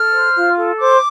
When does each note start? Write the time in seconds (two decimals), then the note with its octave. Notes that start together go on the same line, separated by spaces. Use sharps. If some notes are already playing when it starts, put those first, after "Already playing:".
Already playing: A4 F6
0.12 C5
0.34 F4
0.57 A4
0.79 C5 D6